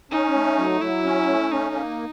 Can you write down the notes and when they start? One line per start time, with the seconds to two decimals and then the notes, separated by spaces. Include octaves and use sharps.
0.11 C#4 D#4
0.35 A3
0.58 F#3
0.81 F#3 E4
1.05 C#4
1.28 A3
1.52 C#4 D#4
1.75 A#3